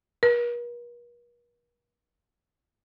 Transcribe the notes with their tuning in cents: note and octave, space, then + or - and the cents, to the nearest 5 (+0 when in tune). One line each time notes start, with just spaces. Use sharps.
A#4 +45